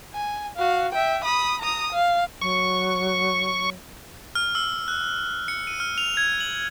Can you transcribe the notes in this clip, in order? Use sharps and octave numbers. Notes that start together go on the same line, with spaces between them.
G#5
F#4 F5
E5 G5
B5 D#6
A#5 D#6
F5
F#3 C#6
F6
E6
F#6
C#7
D#7
F6
F7
G#6
F#7